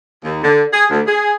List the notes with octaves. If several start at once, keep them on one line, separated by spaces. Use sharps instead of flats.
D#2
D3
G#4
D2
G#4